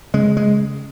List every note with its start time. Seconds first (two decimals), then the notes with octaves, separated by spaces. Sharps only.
0.14 C#3 G#3
0.37 G#3